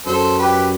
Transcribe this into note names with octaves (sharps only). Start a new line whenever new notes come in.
F#2 A4 C5
G4 B4